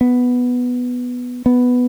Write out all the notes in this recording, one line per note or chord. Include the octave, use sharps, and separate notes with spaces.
B3
B3